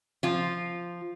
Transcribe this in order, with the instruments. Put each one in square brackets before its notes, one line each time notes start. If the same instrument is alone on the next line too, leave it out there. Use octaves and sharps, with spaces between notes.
[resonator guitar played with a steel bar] F3 F4